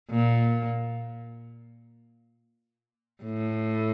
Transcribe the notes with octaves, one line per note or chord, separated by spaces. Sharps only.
A#2
A2